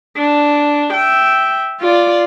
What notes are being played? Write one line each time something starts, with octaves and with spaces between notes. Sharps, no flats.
D4
E5 G5
F4 D5